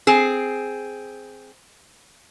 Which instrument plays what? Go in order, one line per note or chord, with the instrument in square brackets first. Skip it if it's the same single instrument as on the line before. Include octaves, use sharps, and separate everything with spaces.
[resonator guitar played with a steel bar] C4 G#4